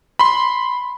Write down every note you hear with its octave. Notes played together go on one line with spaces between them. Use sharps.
B5 C6